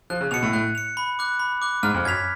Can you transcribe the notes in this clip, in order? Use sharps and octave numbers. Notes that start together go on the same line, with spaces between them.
F3 F#6
C#3
B2 C#7 F7
A2
A2 F#6
C#7 F7
B5
D6 F#6
B5
D6 F#6
G#2 F6
F2
F#2 G#6 B6 F7